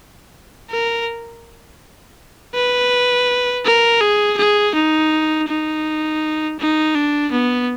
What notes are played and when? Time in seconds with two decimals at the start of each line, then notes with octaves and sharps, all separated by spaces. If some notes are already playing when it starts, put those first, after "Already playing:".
0.70 A#4
2.54 B4
3.65 A#4
4.01 G#4
4.38 G#4
4.75 D#4
5.48 D#4
6.59 D#4
6.95 D4
7.32 B3